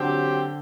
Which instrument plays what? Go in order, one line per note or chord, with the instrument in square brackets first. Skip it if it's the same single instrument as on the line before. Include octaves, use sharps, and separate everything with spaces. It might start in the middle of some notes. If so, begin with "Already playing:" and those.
Already playing: [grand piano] D3 [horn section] F#3 C4 G4